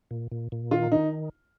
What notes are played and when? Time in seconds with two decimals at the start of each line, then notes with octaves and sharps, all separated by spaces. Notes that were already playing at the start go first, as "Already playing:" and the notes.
0.11 A#2
0.32 A#2
0.52 A#2
0.71 D#3 F4
0.92 D#3 D#4